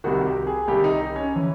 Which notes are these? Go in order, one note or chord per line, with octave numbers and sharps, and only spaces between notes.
C2 C3 D#3 F#4
G4
G#4
C2 C3 D#3 G4
D#4
C#4
E3